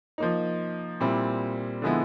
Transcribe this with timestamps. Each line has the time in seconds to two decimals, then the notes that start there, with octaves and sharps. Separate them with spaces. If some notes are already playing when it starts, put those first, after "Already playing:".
0.18 F3 A#3 D#4
1.00 A#2 G3 C4 E4
1.82 D3 F3 G#3 B3 E4